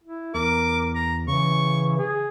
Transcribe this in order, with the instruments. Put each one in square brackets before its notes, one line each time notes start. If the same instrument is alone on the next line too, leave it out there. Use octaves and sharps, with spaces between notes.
[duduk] E4
[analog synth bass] E2 [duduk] A#4 [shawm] D6
[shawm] A#5
[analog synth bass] C#3 [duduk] E3 [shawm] C#6
[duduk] G#4